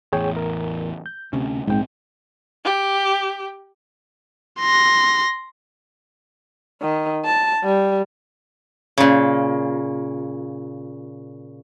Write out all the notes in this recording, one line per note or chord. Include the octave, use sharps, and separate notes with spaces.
A1 E2 G#4 C#5 G5
A#4
G6
D2 C3 C#4
A#1 G#2 E3 C4 G5
G4
C6 A#6
D#3
A5
G3
A#2 C#3